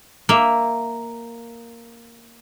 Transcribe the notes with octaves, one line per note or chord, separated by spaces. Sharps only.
A#3 E5